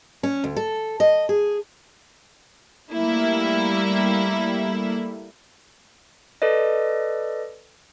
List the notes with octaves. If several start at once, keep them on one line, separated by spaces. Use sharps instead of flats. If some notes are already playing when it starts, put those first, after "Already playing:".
C#4
D2
A4
D#5
G#4
G3 A3 A#3 E4
A4 B4 D5 D#5